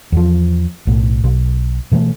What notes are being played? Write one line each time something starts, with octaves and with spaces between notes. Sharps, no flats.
E2 F3
B1 A2
B1
B2 E3 F#3 A3